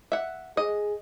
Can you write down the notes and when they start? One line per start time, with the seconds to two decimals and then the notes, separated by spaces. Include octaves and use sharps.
0.12 E5 F#5
0.57 G#4 D#5